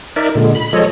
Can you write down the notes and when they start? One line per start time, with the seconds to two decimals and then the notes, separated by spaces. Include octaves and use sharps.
0.16 D#4 A#4 D5 E5
0.35 A#2 D3 G#3
0.55 B5
0.73 F3 G#3 A4 C#5 D#5